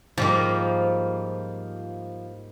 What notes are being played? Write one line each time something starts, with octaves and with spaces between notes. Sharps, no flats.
G#2 F3 G3 A#3